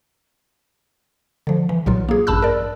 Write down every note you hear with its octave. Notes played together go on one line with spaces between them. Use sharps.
D3 F3
E3
B1 A#2 F#3 F4
A#3 G#4
A1 G2 A5 B5 E6 F#6
A#4 D5